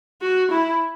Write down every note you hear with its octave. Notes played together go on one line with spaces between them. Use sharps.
F#4
E4